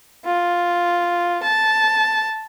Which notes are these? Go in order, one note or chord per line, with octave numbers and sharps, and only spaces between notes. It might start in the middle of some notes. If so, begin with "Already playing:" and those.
F4
A5